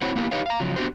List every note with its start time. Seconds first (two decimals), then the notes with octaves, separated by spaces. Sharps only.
0.01 C4 E4 F#4 C5 C#5 F#5
0.16 A#3 B3 E4 G4 A#4 B4
0.31 D#4 G4 B4 C#5 D#5 F5
0.46 F5 A#5
0.60 C#3 F3 F#3
0.76 B3 D4 F#4 G4 C5